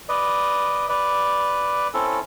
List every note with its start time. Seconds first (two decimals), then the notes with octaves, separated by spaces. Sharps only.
0.09 B4 D5 D#5
0.89 B4 D5
1.94 C4 C#4 E4 A4